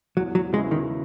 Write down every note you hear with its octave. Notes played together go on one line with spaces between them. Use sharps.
E2 F#3
F#3
C#3 F#3 G#3 B3 E4
D#3